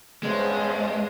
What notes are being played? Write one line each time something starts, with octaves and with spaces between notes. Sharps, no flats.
E2 G2 G#3 C4 C#4 C5 D#5